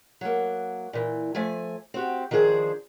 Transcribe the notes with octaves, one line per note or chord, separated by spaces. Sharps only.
F#3 A#3
A#2 E3
F3 A3 G#5
C4 F#4 G4
D#3 F3 D4 G#4 C5